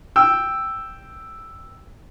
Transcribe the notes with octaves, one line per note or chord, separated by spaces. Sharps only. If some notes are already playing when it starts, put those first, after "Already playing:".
G5 E6